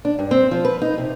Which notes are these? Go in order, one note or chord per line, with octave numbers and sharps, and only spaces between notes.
D4
G2
C4
F3
B4
D#4
C3